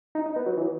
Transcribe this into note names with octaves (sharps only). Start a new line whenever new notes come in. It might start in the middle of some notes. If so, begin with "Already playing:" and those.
D#4
D#4
B3
F#3
E3